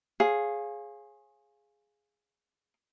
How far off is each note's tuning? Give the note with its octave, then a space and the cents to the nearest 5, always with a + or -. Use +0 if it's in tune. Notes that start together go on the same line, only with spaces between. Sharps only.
G#4 +0 C#5 -45 F5 +5